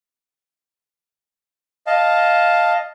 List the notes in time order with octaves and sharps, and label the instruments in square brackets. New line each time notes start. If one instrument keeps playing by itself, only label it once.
[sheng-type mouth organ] D#5 F5 A5